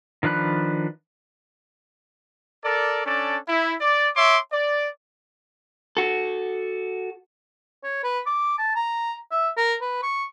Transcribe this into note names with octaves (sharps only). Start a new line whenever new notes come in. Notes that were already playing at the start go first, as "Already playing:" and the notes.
D#3 F3 D4 B4 F#6
A4 A#4 D5
C#4 D4 A4 D5
E4
D5
C#5 E5 C6 D6
D5
F#4 A4
C#5
B4
D6
A5
A#5
E5
A#4
B4
C#6